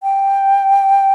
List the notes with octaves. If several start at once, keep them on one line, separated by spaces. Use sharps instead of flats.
G5